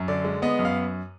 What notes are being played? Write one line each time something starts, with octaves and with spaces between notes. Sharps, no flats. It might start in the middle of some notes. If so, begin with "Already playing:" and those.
Already playing: F#2
D3 D5
G#3
B3 D#5
F#2
F5